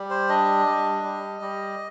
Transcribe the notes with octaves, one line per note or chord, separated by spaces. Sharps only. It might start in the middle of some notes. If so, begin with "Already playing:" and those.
Already playing: G3
C5
D4 D#5
G3
G3
G3